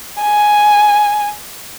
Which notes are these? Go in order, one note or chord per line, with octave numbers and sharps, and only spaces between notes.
G#5